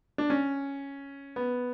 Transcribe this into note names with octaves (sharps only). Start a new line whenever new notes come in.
D4
C#4
B3